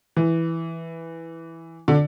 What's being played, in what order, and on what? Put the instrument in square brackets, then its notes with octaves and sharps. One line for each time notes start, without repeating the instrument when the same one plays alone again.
[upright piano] E3
D3